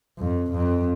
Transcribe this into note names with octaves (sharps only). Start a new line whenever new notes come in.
F2
F2